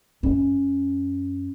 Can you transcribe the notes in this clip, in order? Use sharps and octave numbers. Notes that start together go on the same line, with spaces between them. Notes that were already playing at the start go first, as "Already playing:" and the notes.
F#2 C#4